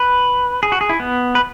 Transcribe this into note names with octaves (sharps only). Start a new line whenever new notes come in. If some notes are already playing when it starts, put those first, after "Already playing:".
Already playing: B4
G#4
F#4
G#4
E4
B3
B4